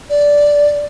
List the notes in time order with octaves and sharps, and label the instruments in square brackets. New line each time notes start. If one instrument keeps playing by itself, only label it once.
[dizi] D5